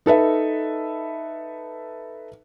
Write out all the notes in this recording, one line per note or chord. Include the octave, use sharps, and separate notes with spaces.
D#4 A4 B4 E5